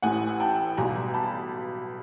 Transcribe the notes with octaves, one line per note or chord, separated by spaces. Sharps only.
A1 A2 E3 F#5 G#5
G5 A5
B1 B2 G3 G#5 A#5
A5 B5